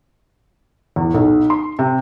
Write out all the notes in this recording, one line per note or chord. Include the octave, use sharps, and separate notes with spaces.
E2
B1
C6
C3